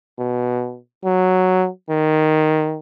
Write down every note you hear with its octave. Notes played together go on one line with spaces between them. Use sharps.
B2
F#3
D#3